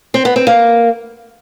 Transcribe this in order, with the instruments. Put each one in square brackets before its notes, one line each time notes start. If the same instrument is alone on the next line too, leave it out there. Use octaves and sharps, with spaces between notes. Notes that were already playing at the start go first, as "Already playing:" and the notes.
[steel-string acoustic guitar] C4
B3
C4
A#3